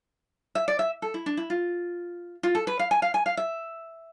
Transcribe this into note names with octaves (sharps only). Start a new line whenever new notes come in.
E5
D5
E5
A4
E4
D4
E4
F4
F4
A4
B4
F5
G#5
F5
G#5
F5
E5